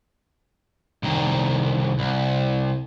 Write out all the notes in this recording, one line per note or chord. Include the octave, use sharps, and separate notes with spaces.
C2 D#3
C2